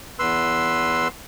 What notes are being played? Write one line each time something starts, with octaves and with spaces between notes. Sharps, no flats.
E2 B4 C6 E6